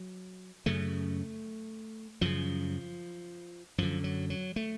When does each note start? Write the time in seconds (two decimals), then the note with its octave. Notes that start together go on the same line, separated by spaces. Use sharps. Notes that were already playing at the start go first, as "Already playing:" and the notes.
Already playing: F#3
0.66 F#2 C#3 A3
2.21 F#2 C#3 F3
3.78 F#2 D3 F3
4.04 F#3
4.30 F#3
4.56 A3